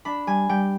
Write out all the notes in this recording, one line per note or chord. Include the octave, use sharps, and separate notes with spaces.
D4 B5
G3 G#5
G3 G5